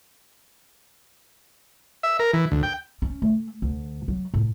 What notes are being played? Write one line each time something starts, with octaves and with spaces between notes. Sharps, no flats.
E5
A#4
E3
D2
G5
C#4
A3
D2
F#3
A2